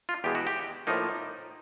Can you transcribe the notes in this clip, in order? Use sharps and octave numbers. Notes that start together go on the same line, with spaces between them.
F4
E2 B2 G#3 G4
F#4
G4
A2 F3 A#3 D#4